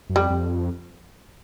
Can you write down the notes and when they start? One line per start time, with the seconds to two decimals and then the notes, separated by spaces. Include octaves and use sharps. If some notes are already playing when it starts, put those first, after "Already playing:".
0.09 F#2
0.16 F2 G3
0.30 F2